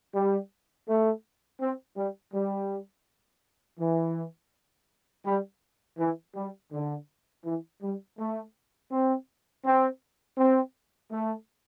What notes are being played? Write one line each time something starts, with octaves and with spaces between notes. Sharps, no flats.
G3
A3
C4
G3
G3
E3
G3
E3
G3
D3
E3
G3
A3
C4
C4
C4
A3